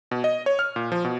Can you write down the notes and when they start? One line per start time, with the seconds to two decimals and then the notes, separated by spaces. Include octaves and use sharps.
0.11 B2
0.24 D#5
0.46 C#5
0.59 F6
0.76 A#2
0.92 F3
1.05 B2